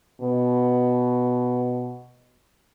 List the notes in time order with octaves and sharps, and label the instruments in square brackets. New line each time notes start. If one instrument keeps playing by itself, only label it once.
[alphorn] B2